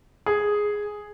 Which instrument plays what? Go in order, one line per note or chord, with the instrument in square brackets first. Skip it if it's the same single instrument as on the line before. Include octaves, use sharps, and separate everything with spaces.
[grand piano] G#4